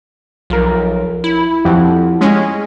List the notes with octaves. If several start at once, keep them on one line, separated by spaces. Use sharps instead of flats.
B1 F3 F4 A#4
E4
F2 F3 G4 F#5
G#3 C#4